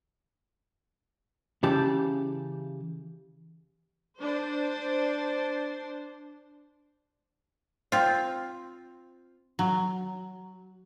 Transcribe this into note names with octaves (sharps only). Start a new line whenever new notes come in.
C#3 E3 G4 A5
D4 C5
C4 F4
F#3